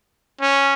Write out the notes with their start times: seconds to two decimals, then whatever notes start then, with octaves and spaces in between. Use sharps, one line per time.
0.41 C#4